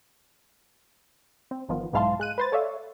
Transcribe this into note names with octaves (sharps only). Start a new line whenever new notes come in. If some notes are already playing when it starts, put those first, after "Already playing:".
C4
G1 D#3 F3 B3 F4
B1 G#2 E4 F5 A5 C6
G#3 F#6 D#7
B4 C5 A6
A4 C#5 D5 E5 F5